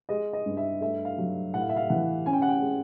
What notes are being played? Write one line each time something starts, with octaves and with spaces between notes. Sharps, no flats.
G#3 D#5
D#5
G2
E5
A3 E5
F5
F#3
A2 F#5
F5
E5
F5
E3 F#5
C#4 G#5
G5
F#5
G5
G#3